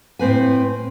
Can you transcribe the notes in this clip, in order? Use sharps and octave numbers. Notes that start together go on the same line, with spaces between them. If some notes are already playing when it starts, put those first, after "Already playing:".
A2 C4 B4 G#5